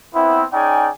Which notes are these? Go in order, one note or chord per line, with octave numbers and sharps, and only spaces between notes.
B3 C4 E4
C#4 D#4 G#4 D5 G5 G#5